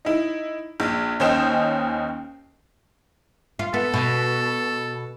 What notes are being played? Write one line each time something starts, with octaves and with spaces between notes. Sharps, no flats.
D#4 E4
A#1
D#2 C#4 C5 D#5 G5 E7
F4
B3 A4
B2